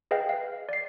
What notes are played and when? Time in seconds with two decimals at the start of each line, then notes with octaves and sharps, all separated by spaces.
0.11 G#4 B4 D#5 F5 G5
0.29 F5
0.69 D5 C7